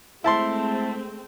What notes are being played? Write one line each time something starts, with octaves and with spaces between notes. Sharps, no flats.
G#3 A3 C4 E4 A5 C6